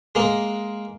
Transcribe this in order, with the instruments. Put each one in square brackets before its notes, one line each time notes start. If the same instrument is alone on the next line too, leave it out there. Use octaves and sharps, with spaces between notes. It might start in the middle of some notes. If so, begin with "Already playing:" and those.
[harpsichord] G#3 A#3